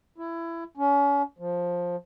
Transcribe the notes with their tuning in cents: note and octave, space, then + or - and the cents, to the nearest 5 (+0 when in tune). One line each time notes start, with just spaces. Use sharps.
E4 +20
C#4 +35
F3 +10